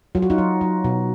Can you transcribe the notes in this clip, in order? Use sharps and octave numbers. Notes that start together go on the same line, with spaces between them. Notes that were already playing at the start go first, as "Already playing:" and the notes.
F#3 F4
F#4
D#4 F4
F#3
F#3
B2